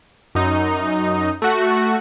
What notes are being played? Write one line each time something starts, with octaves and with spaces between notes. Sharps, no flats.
F#2 D#4
A3 F#4